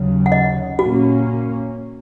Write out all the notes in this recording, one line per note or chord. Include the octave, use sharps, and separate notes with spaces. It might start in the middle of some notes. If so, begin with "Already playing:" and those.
Already playing: D#2 C#3 F#3
F#5
D#5
A#2 A#3 C#4 F#4